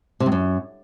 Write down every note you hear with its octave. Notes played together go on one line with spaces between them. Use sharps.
C3
G2
F#2